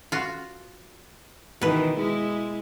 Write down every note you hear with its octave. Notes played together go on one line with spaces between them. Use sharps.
F4 F#4
B2 D#3 E3 B4
G#3 E4